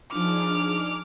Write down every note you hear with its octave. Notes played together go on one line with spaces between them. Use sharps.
F3 D4 D#4 G#4 D6 F6